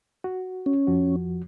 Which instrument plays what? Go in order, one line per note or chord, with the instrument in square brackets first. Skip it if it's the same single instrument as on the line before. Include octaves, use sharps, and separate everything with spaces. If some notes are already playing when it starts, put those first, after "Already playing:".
[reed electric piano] F#4
[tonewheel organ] C#4
[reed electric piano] F2 F3 F#4